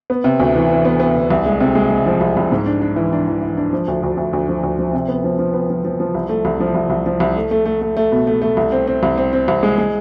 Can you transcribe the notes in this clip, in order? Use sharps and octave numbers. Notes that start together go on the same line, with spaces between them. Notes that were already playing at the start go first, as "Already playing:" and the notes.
B3
C3
D2
E3
E3
B3
B3
D2
C2
G#3
C3
G#3
G#3
F3
C2
C2
G#2
D4
D4
E3
D4
E3
E3
D4
F3
D2
D2
D2
D2
F3
D2
F3
C3
B3
F3
F3
B3
F3
F3
F3
C2
A3
C2
F3
C2
C2
F3
C2
A3
A3
A3
A3
A3
B2
A3
A3
C2
C4
C4
C2
C4
C4
C2
G#3
G#3